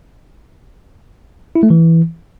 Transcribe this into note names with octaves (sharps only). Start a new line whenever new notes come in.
E4
A3
E3